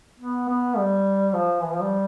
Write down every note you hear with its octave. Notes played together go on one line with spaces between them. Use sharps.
B3
B3
G3
F3
E3
F3
G3